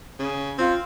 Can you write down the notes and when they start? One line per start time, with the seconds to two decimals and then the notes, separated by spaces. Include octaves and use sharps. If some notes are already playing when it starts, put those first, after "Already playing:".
0.19 C#3
0.58 C4 F4